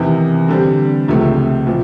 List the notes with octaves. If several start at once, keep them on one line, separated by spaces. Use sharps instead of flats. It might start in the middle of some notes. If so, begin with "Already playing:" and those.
Already playing: E2 C3 D#3
D3 G3 C4
C#2 C3 F3 A3
A#2 F3